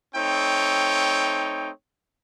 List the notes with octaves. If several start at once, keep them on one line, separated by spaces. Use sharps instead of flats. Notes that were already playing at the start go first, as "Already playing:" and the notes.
A3 C4 D#4 C#5 G5